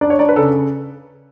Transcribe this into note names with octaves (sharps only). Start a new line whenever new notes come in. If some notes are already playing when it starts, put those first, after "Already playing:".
D4 D5
C#5
D4 D5
B4
C#3 A4